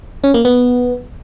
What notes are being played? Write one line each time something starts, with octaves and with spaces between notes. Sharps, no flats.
C#4
A#3
B3